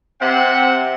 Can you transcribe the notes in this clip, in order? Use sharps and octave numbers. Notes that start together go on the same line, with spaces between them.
C3 C4 F#5